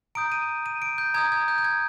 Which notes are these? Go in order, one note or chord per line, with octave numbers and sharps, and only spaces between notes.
A#5 D#6 G6 D7
D#7
D#7
D7
G6
A#5 D#6 G6 G#6
G#6
G6
G6
G#6